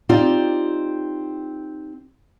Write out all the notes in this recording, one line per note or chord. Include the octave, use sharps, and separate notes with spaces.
C4 D#4 F4 G4 D5